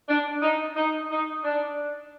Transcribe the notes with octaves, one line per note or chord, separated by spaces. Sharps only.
D4
D#4
D#4
D#4
D4